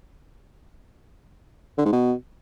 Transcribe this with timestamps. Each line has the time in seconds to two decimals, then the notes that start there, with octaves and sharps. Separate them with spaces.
1.78 D3
1.85 G#2
1.93 B2